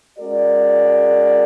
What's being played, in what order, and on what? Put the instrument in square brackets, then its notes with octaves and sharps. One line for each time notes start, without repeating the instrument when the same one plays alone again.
[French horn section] G#3 C#4 F#4 A#4 D5